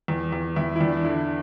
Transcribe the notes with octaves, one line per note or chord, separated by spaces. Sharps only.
E2
E2
E2 E4
E4
E2 D4
D4
D3 E4